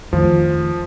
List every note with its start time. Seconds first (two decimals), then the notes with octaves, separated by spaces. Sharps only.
0.13 F2 D#3 F3 A3